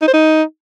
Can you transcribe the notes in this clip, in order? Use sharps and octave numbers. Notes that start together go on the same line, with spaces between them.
D#4
C5
D#4